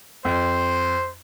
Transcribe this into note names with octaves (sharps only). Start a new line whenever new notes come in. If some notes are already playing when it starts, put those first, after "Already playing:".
F2 C5